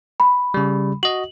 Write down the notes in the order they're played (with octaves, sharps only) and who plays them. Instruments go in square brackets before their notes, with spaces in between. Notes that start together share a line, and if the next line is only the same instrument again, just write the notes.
[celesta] B5
[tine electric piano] C#3 G3
[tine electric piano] F#4 D#5 [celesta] F#7